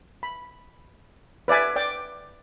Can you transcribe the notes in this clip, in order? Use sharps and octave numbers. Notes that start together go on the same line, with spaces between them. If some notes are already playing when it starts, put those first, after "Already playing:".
B5
B4 D5 E5 G#5
D5 G5 D6